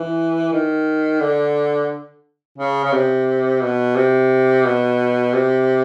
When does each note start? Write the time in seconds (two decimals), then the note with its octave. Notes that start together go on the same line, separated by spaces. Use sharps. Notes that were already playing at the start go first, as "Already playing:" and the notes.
Already playing: E3
0.53 D#3
1.21 D3
2.58 C#3
2.84 C#3
2.93 C3
3.62 B2
3.96 C3
4.65 B2
5.34 C3